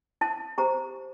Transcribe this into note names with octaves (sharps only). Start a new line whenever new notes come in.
E4 A5
G4 C5 A#5